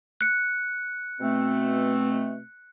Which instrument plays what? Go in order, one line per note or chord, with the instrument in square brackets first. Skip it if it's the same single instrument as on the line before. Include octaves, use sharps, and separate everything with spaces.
[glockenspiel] F#6 C#7
[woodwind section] B2 A3 C4